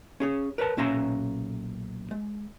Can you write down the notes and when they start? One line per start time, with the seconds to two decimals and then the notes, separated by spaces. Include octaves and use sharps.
0.20 C#4 G#4 C#5
0.58 A#4 B4 C#5 A5
0.77 B1 A#2 C#4 E5 A#5 C6
2.11 G#3